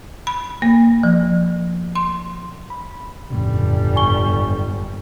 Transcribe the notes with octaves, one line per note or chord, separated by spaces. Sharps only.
B5
A#3
F3
C6
B5
G1 F2 A2 C#3 G3
G#5 C#6 G7